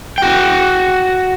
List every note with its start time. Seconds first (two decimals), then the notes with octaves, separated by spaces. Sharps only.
0.18 F#4 G5